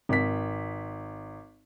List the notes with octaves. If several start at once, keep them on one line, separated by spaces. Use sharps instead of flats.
G#1 B6